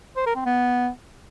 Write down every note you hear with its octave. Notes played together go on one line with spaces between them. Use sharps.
C5
A#4
C4
B3